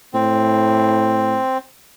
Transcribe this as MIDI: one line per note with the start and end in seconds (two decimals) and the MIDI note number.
0.14 1.38 45
0.14 1.58 60